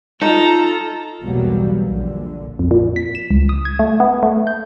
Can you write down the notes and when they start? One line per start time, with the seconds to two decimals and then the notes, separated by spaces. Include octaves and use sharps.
0.21 D#4 F4 A4 A#5
1.23 B1 E2 B2 F#3 G3 A#3
1.88 A#1 D3
2.59 F2
2.71 A#2
2.96 B6
3.15 E7
3.31 C#2
3.49 D#6
3.65 G#6
3.79 A3
4.00 B3
4.23 A3
4.47 G6